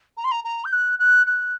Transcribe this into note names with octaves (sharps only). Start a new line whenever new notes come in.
A#5
C6
A#5
A#5
G6
F#6
F#6
F#6